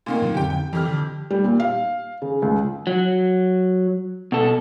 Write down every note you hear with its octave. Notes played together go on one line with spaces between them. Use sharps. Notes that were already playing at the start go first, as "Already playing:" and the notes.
A#2 D#3 A#3
A2 C#3 F#3
F2 D3 G4 G5
G5
F2 E3 G4 F6
D3
G3
A#2
F5
C#3
C#2
F#3
B2 A4